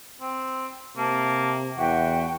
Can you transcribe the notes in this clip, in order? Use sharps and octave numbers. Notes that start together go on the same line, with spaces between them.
C4
C3 A#3 A5
E2 F#4 E5 F#5 G5